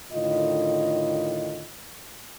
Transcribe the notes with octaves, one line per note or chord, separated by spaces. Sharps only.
A2 D3 D#3 F4 D#5